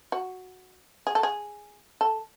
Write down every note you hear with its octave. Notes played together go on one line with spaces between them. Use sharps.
F#4
G#4
A4
G#4
A4